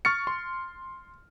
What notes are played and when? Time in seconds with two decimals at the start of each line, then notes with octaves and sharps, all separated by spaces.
0.05 C#6 F6 A6 C#7
0.27 C6